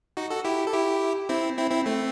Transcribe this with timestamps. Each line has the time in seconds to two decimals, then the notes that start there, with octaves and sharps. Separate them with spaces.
0.17 D#4 F#4
0.31 F#4 A4
0.45 E4 G4
0.67 A4
0.73 E4 G4
1.29 C4 E4
1.57 C4 E4
1.71 C4 E4
1.86 A3 C4